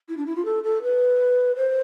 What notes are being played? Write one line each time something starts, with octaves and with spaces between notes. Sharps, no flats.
E4
D4
E4
F4
A4
A4
B4
C5